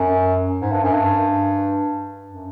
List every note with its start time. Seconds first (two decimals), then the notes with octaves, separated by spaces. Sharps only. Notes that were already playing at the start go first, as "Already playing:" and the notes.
Already playing: F#2
0.61 G#2
0.72 G2
0.83 F#2
0.94 G2
2.26 F#2